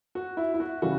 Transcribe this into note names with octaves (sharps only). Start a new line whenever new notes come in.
F#4
E4
E4
F#4
C#3 E3 G3 F#4